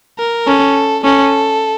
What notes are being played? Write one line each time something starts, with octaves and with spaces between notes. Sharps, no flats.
A#4
C#4 A4
C#4 A4